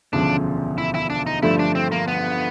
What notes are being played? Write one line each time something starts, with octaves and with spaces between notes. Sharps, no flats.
E1 D2 C#3 F3 D4
E4
E4
D4
D#4
G2 D3 F3 A3 E4
D4
C4
A#3
B3